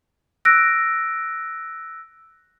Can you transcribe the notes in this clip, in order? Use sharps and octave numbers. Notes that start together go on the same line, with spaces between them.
E6 F#6 A#6 D7